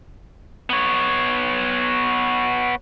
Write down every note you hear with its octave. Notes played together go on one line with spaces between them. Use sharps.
B3 C#5